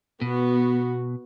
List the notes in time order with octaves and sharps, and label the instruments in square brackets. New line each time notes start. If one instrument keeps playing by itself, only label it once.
[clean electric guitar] B2 [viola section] B3 F#4